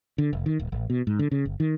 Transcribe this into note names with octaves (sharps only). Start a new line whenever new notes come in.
D3
F1
D#3
D1
A1
B2
G#2
D3
C#3
G1
D#3